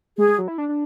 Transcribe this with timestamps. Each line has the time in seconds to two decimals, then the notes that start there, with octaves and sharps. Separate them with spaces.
0.18 G#3 G#4
0.28 G#3
0.38 F#3
0.48 E4
0.58 D4
0.68 D4